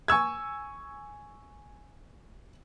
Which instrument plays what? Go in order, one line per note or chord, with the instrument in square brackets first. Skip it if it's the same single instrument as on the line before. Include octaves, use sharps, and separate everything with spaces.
[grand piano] G#5 C#6 E6 G#6